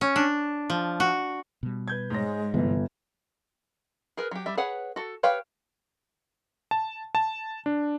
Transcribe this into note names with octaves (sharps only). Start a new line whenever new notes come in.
C#4
D4
F3
F#4
B2 G3
B4 G6 G#6
G#2 G#3 C#5 A#6
G1 C3 E3
G#4 A#4 B4
F#3 G4
G3 E5
G#4 B4 C#5 F#5
F#4 A4
G4 B4 C#5 F5 G5
A5
A5
D4